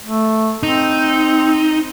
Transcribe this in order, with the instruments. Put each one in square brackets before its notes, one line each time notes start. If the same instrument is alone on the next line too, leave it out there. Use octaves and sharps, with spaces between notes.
[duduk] A3
[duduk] C4 [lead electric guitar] D#4